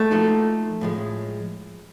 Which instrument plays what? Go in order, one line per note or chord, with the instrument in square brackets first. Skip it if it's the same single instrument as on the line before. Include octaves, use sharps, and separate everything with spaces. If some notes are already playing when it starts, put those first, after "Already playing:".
Already playing: [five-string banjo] A3
[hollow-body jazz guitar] F3 A#3 D#4 F#4 A4
A2 F3 G#3